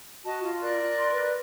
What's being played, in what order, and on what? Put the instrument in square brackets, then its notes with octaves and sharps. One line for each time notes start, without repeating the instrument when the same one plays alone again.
[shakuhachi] F#4 [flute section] D#5 A5
[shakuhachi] F4
[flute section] A#4 D5 F#6
[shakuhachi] C6
B4